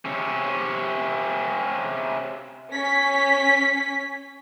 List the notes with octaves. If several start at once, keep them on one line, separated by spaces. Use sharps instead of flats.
C3 C#4
C#4 B6